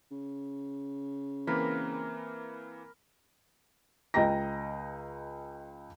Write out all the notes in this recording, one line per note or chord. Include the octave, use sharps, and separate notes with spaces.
C#3
E3 A#3 C4 A#4 B5
C#2 D#5 G5 A#5 A#6